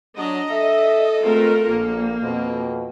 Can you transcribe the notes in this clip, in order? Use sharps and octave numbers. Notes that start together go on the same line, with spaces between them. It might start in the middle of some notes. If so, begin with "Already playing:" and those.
F#3 D4 D#5 A#5
A4 E5
G#3 A3 C4 F4 A#4
A#1 A#3
F2 B2 C4